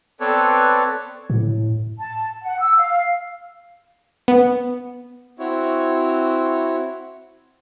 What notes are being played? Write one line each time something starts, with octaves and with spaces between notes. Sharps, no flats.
B3 C4 A4 B4 C#5 D5
A2
A5
F#5
E6
F5
B3
C4 E4 F#4 C#5